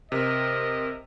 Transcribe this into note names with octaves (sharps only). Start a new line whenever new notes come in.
C3 A#4 D#5